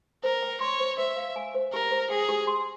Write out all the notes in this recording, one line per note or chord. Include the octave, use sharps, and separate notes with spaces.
A#4 C5
G5
C#5 C6
C5
C5 E5
F5
G#5
C5
G4 A#4
C5
G#4 G5
G4
C6